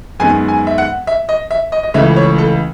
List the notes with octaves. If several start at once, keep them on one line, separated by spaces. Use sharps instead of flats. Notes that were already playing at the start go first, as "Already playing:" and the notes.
F#2 D#3 G#3 B3 G#5
G#5
E5
F#5
E5
D#5
E5
D#5
D#5
C#2 C#3 E3 A3 E5
C#5
A4